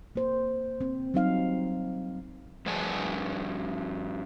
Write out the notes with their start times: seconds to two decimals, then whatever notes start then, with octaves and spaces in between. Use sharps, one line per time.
0.16 A#3 C5
0.81 C4
1.14 F#3 G3 C4 D#4 F5
2.66 G2 F3 G#4 D5 G#5 A5